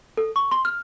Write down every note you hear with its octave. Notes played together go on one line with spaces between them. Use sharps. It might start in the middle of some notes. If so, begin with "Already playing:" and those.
A4
C#6
C6
F6